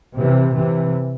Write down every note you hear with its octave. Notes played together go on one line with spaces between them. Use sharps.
C3 E3
C3 E3